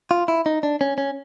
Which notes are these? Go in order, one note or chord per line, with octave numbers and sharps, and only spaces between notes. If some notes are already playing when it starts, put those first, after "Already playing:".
F4
E4
D#4
D4
C#4
C#4